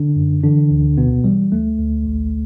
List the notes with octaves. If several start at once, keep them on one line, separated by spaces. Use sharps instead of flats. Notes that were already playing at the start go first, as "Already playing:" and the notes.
Already playing: D3 D4
F#2
D3 E3 D4
D2
B1 B2 B3
E3 G3
D2 A3
D2
A1